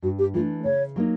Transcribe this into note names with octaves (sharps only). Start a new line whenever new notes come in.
G2 F#4
G4
E3 A3 D4 F4
C#3 C#5
F#3 A#3 D#4